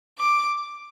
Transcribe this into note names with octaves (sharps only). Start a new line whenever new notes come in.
D6